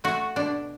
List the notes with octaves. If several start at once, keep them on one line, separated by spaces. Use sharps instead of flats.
A3 F#4
B2 D4